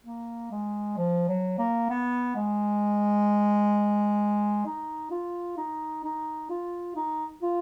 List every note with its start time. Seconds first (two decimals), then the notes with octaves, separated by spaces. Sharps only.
0.05 A#3
0.51 G#3
0.98 F3
1.28 F#3
1.59 A#3
1.90 B3
2.36 G#3
4.66 D#4
5.11 F4
5.57 D#4
6.04 D#4
6.50 F4
6.96 D#4
7.42 F4